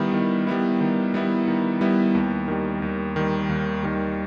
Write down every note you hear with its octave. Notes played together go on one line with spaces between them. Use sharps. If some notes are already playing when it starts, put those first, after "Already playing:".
Already playing: D#3 G3 B3 E4
D#3
G3 B3 E4
D#3
G3 B3 E4
D#3
G3 B3 E4
D#2
D#3 G3
D#2
D#3 G3
D#2
D#3 G3